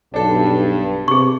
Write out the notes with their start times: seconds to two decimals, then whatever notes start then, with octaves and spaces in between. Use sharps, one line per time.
0.14 B1 G2 D4 A4
1.08 C3 G#4 C#6